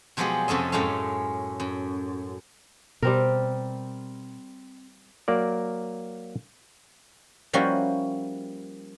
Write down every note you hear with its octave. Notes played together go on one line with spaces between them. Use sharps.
B2 F3 F#3 G#3 G4 G#4
F2 C3 C#4 A4 D#5
F#2 A2 G#3 A3 C#4 F5
F#2
B2 G3 C4 A#4
F#3 A#3 A#4 D5
F3 G3 A#3 C#4 E4 F#4